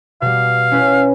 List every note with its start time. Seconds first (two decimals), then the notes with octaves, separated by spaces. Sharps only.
0.22 B2 G3 F5
0.71 C#4 E4 B4